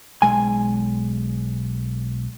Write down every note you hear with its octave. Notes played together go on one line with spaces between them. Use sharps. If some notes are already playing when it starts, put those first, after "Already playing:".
B1 G#3 G#5